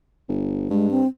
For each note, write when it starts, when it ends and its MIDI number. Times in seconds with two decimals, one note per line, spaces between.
0.29 0.69 31
0.70 1.02 43
0.70 0.88 56
0.91 1.07 60